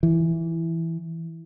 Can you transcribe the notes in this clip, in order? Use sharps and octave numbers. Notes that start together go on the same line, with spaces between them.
E3